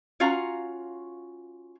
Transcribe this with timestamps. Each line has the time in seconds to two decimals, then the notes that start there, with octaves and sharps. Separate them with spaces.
0.20 C#4 F4 F#4 F5 A#5